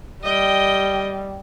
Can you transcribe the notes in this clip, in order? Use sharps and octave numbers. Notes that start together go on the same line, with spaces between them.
G3 D#5 G5